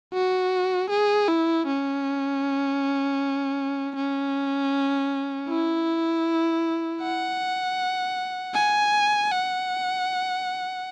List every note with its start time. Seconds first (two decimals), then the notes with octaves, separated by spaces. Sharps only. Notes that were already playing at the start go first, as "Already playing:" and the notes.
0.13 F#4
0.90 G#4
1.28 E4
1.67 C#4
3.96 C#4
5.49 E4
7.02 F#5
8.54 G#5
9.32 F#5